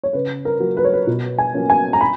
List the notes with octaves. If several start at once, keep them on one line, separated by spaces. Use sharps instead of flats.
C#5
C#3 B4
A#4
F#3 A#3
B4
C#5
B4
B2
G#5
F#3 A#3 C#4
G#5
A#5
B5